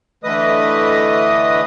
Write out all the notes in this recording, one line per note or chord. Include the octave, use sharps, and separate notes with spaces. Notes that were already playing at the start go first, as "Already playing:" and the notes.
D3 E3 A3 B4 D#5 D#6